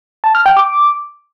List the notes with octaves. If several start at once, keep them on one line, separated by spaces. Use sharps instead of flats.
A5
F6
G5
D6